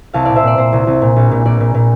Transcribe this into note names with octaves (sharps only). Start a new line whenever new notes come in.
C2 F5 A5
A#2 D5 F5
C5 E5
A#2 D5
A#2 C5
C2
C2
A#2
A#1
A#2
A#1 D5
A#2
A#2